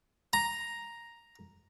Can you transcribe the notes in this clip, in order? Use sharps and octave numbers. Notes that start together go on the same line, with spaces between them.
A#5